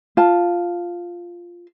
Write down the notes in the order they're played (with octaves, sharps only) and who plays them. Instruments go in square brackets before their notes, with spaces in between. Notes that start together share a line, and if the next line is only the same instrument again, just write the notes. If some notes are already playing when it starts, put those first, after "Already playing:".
[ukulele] F4 A5